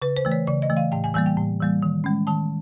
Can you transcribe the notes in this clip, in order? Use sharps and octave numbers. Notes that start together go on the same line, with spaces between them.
C#3 B4
C5
E3 A3
C#5
C#3 D5
D#5
E3 A3
F5
A2 G5
G#5
E3 G3 A#3 G#5
G5
A2
E3 G3 A#3
D#3
G#3 C#4
D#3 A5